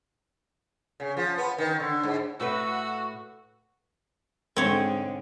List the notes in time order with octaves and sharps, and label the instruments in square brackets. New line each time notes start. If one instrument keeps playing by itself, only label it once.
[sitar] C#3
F3
B3
D#3
D3
G#2
[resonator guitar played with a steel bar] A2 A4 B4 [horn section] F#4 [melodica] E6
[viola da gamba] G#2 D3 G#3 [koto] C4 C#5